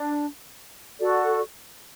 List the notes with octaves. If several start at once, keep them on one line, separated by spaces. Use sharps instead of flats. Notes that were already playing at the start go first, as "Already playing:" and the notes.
Already playing: D4
F#4 A4 D5